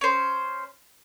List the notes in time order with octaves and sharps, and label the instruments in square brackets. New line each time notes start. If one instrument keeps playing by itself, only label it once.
[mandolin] C#4 C5